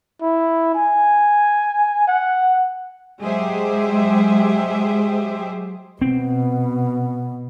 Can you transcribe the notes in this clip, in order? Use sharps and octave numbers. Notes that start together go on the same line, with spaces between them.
E4
G#5
F#5
F#3 G#3 G4 G#4 C5 E5
B2 C4